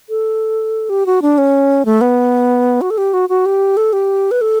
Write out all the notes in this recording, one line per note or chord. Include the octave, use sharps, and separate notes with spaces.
A4
G4
F#4
D4
C#4
A3
B3
F#4
A4
G4
F#4
F#4
G4
A4
G4
B4
A4